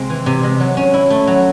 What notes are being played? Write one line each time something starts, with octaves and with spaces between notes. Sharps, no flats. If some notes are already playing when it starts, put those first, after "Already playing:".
Already playing: C3 G#3 C4
E3
C3
G#3
F#3
C#4
E4
A3
F#3